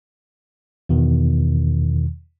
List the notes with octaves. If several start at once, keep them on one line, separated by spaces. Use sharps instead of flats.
E2 B2 D#3